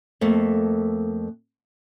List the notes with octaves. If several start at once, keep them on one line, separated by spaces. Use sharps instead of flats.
F2 A3 A#3